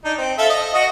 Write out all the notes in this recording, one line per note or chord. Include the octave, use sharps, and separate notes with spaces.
D4 D#4
C4
A4 E5 F5
D#5
F#4 D#5